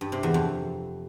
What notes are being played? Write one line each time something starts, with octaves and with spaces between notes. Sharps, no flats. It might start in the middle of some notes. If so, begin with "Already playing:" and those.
G2
C3
E2
F2